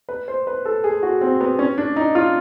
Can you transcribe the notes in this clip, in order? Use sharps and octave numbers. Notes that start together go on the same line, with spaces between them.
B4
C5
B4
A4
G#4
F#4
C4
B3
C#4
D4
D#4
F4